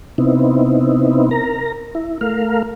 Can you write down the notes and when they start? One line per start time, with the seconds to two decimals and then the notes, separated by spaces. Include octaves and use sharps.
0.18 C3 B3 C4 D#4 E4
1.31 A#4 A#5
1.95 E4
2.21 A3 A#4 F5